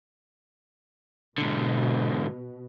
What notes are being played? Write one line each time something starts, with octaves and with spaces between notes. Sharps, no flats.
G#2 B2 D3